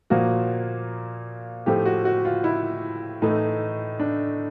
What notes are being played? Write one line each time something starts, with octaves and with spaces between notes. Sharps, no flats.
A#2 F3 A#3 F#4
A2 F3 A3 G4
F#4
F#4
F4
E4
A2 E3 A3 D#4
D4